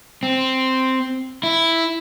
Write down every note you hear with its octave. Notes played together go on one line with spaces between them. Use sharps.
C4
E4